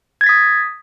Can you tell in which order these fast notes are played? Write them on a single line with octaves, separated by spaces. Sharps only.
G#6 A6 B6 D#6